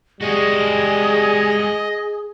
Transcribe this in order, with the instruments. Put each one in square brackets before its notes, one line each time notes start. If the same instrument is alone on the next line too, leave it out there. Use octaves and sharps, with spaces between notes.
[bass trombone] G3 [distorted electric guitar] G#3 F#4 [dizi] G#4 [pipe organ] D#5